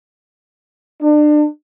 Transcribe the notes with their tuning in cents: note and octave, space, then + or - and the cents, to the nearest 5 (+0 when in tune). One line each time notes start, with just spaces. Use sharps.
D4 +30